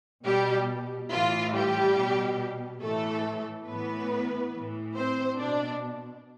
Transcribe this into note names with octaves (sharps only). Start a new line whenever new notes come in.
B2 G3 G4
A2 E3 F4
G3 G4
B2
A2 E3 A3 A4
A2 E3 B3 B4
A2 E3
C4 C5
B2 D4 D5